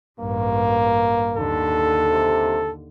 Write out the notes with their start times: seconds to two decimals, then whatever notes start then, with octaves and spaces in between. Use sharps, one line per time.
0.20 A1 G2 A#3
1.37 D#2 D3 A4
2.11 C3